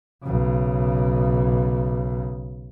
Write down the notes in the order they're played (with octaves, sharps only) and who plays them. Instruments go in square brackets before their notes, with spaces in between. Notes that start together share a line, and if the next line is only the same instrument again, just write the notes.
[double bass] B1 C#3